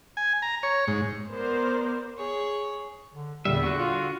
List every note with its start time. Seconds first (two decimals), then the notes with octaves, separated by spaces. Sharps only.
0.17 G#5
0.42 A#5
0.63 C#5
0.88 G#2
1.30 B3 A#4 C5 D5
2.18 G#4 C#5
3.13 D3
3.45 E2 A#2 D3 G3 E5
3.63 D3 F#4 F#5 C#6
3.78 F4